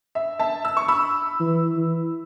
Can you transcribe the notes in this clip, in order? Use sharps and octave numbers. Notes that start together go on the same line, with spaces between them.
E5
E5 A5
E6
C#6
B5 E6
E3
E3